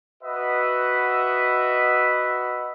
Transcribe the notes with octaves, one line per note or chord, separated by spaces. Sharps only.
F#4 B4 D#5 E5 F#5